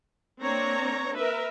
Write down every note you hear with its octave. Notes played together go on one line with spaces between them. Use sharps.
A#3 C4 D4 C#5 A#5
A#4 B4 E5